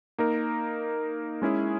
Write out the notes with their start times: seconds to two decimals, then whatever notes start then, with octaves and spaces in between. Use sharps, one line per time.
0.18 A#3 D#4 A#4
1.42 G#3 C#4 E4 G#4